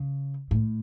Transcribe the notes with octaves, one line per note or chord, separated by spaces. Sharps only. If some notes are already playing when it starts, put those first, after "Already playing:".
Already playing: C#3
A2